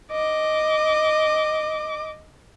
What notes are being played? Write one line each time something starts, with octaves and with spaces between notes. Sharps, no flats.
D#5 D6